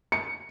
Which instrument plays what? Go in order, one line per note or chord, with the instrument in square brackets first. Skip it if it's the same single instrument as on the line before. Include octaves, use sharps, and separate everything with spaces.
[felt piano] C#7